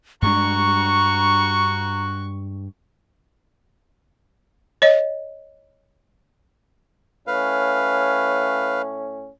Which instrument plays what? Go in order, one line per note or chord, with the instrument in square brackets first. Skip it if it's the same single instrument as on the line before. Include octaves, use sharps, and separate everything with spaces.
[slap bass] G2 G#3 D4 [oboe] F#4 [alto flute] A#5 [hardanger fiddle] C#6
[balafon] C#5 D#5
[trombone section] A2 C#4 [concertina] B4 F5